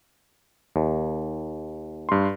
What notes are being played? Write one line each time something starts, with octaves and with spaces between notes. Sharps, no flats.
D#2
G2 C6